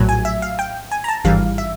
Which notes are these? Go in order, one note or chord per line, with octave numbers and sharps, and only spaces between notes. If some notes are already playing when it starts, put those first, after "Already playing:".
Already playing: A#1 A2 F#3
G#5
E5
F5
G5
G#5
A#5
A5
G#1 G2 E3 G3 F5
E5